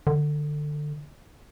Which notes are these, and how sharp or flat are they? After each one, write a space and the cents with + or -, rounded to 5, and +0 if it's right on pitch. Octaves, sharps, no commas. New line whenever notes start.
D3 +20